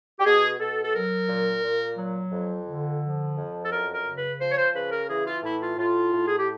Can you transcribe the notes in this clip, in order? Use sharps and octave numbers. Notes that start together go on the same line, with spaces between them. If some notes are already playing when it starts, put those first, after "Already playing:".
G4
B2 G#4
B2 A4
A4
F#3 A#4
A#2
A#2
F#3
F2
D3
F3
F2
A4
F#2 A#4
A#4
C#3
B4
F3 C5
C#5
C5
C#3 B4
A#4
E3 G#4
F4
A2 E4
F4
A2 F4
A2
G#4
G4